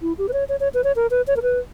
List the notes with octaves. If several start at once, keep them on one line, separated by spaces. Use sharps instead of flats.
E4
G4
B4
C#5
C#5
C#5
B4
C#5
A#4
B4
C#5
A#4
B4